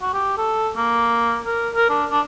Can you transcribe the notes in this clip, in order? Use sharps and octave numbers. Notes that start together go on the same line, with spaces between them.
F#4
G4
A4
A#3
A#4
A#4
D4
D4